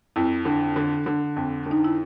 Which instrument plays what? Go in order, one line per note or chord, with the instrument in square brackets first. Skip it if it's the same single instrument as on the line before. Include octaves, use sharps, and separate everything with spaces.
[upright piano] F2 [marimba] E4
[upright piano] D3
D3
D3
F2
[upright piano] D3 [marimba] D#4
[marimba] E4